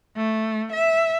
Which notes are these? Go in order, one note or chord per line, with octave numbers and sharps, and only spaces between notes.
A3
E5